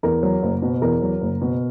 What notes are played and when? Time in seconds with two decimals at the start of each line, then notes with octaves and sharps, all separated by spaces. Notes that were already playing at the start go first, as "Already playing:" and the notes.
0.03 E2 A#4
0.23 F#3
0.43 F#1
0.62 B2
0.82 E2 A#4
1.02 F#3
1.21 F#1
1.42 B2